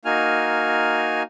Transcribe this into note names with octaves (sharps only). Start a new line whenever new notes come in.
A#3 D#4 F#4 G#5 F6